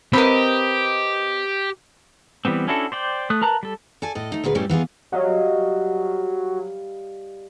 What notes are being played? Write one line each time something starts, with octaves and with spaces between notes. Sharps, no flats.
C4 G4 A#4 B4 D#5 B5
E3 G3 B3 C4
C#4 D4 E4 F#4 A4
C5 D5 G5
A3 D#6 F#6
A#4 B4 A5 A#5 F#6
G3 A4
A4 D5 G#5 A5
A2 A4 D#5
A3 D#4
D2 A#2 G#4 B4
F#2 A2 E3 G3 C#4
E3 B3 F4 G#4
F#3 G3 D#5 F5